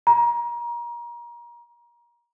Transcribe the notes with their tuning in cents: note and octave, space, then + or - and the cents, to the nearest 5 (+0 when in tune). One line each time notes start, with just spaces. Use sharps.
A#5 +30